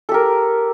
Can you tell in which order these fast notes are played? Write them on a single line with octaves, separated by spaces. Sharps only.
A4 G4 A#4